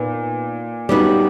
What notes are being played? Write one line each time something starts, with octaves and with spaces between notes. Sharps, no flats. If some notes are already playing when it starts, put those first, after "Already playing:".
Already playing: A#2 B3 D#4
G3 B3 D#4 F#4